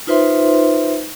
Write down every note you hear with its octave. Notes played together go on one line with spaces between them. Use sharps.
D#4 F4 B4 C5 E5 C6